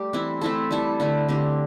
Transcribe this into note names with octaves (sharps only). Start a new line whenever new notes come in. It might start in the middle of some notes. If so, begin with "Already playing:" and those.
Already playing: G3 A3 G4
E3 C4 E4
A3 C4 E4 A4
G3 E4 A4
D3 A3 E4
D3 C4 G4